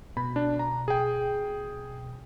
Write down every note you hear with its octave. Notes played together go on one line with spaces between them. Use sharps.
B2 B5
D4
A#5
G#4 G5